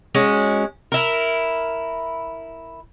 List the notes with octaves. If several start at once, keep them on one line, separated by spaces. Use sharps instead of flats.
G#3 C#4 F#4
E4 A#4